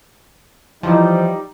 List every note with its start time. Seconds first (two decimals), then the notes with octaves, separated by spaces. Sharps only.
0.83 E3 F3 G3 D#4